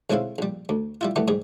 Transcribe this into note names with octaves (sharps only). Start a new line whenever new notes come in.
B1 G#3 C4 C#4 E4 F5
A#1 G3
D2
G3 E4 F4
E3 G3 A3 B3
G#2 G3 G#4